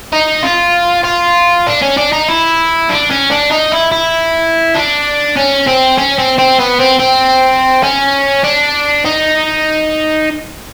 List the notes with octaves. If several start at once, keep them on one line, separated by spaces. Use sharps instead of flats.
D#4
F4
F4
D4
C#4
D4
D#4
E4
D4
C#4
D4
D#4
E4
E4
D4
C#4
C4
C#4
C4
C4
B3
C4
C4
C#4
D4
D#4